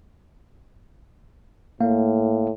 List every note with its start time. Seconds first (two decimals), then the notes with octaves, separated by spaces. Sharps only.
1.80 A2 A#3 F5